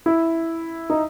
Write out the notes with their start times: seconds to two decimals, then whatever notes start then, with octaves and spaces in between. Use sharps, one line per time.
0.06 E4
0.90 D#4